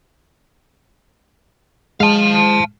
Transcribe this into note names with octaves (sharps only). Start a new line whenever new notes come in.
G#3 F5 A5